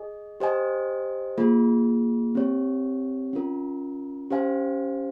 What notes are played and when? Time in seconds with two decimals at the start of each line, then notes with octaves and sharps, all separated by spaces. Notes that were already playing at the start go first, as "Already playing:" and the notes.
Already playing: G#4 D#5 G#5
0.40 G4 C5 D#5 G#5
1.38 A#3 F4 G#4
2.35 C4 G4 C#5
3.33 C#4 F4 A#4
4.30 C#4 G4 C5 F5 G#5